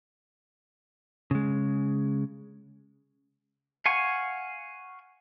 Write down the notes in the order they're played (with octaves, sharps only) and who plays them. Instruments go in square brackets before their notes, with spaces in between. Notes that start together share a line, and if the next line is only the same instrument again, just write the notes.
[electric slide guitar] C#3 G#3
[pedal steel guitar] F5 F#5 G#5 C#6